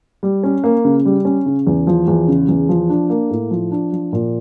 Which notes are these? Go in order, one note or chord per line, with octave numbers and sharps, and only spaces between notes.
G3
C#4
A#3
C#3
G3
C#4
C#3
E2
F3
E2
C#3
E2
F3
D4
A#3
A2
F3
D4
F3
A#2